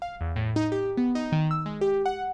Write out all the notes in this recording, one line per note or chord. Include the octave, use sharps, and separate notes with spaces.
F5
E2
A2
D#4
G4
B3
D#4
D#3
E6
G#3
G4
F#5